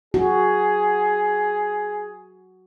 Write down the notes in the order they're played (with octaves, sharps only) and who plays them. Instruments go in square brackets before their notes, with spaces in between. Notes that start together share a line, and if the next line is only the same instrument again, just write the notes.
[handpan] F#4 [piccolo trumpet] G#4